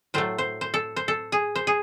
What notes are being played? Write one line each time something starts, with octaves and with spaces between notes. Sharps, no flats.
A2 F#3 A3 C5
C5
C5
A4
C5
A4
G#4
C5
G#4